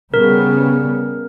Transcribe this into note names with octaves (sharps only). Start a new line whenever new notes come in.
C#3 G3 B3 A#4